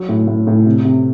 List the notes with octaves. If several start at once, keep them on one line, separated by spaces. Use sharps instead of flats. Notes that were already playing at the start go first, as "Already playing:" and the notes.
Already playing: F#3
A2
A2
A2
C3
C3